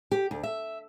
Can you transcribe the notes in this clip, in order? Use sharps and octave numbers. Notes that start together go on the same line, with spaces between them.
G4
D2
E5